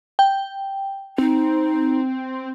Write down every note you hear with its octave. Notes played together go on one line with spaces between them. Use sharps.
G5
C4 D#4